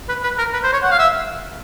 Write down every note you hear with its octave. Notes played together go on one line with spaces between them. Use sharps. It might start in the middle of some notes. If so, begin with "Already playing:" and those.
B4
B4
A#4
B4
C5
C#5
F#5
F5
E5